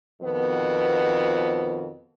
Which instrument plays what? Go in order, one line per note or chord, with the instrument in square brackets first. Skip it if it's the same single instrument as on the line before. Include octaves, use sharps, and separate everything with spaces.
[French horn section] F2 B2 D#3 F3 B3